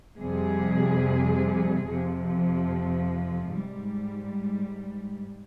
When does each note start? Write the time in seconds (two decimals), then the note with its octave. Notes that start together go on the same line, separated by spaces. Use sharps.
0.18 F2 C3 G3 G#4
1.86 F2 C3 F3
3.55 G#2 G3